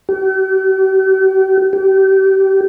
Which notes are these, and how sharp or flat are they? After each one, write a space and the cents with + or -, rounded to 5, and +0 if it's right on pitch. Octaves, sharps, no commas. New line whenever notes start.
G4 -45
G4 -30